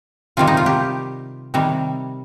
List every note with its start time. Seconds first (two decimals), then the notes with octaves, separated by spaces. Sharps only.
0.37 C3 D#3 G3 F4
0.47 D#4
0.57 F4
0.66 G4
1.54 C3 D#3 G3